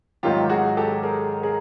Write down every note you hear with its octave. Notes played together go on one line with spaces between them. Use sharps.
G#2 D#3 F#3 F4 G4
F#4 G#4
G4 A4
G#4 A#4
G#4 A#4